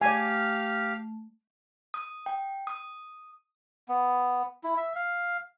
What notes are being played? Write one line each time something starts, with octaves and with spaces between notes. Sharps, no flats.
A3 G4 D5 F5 G#5 F6
D#6
G5
D#6
B3
E4
E5
F5